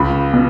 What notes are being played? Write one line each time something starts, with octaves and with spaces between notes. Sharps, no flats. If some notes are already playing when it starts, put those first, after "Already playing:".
Already playing: C#2 B5
B2